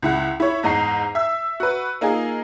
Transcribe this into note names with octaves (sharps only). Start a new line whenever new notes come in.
C#2 E4 F#5
E4 C#5
E2 G#2 D#4 A#5 C7
E5 E6
F#4 B4
A#3 D#4 F4 G#4